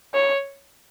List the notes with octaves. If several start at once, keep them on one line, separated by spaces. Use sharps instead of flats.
C#5